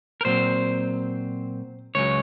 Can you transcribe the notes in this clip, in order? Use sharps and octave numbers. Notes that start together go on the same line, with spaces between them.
A#4
A#2 F#3 C4 C5
C#2 C#3 F#3 C#5